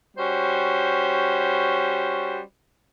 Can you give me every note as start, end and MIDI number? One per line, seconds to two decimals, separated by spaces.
0.17 2.40 55
0.17 2.40 61
0.17 2.40 66
0.17 2.40 72